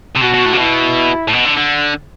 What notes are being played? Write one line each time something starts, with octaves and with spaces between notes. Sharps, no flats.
C3
B2 F#4
B2
A2
C3
B2 E4
A2
B2
D3
D3